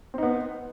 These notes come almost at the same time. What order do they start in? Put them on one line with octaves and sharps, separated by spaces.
C4 D#4 B3